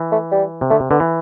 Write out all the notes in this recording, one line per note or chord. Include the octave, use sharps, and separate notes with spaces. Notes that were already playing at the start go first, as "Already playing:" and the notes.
Already playing: E3
A3
G3
C3
D3 A3
C3
D3 B3
E3